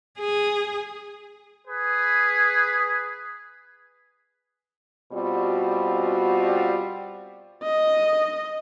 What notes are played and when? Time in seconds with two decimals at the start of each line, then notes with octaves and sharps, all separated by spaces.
0.19 G#4
1.67 G#4 B4
5.12 B2 G3 C4 F4 F#4
7.63 D#5